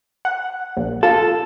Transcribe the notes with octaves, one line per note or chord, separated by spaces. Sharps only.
F#5
A#1
F4 A4